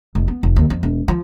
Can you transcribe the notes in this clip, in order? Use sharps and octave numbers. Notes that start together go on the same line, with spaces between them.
F1
B3
F1
D#2
F2
E1
F3